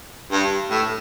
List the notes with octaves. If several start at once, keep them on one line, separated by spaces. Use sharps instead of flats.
G2
A2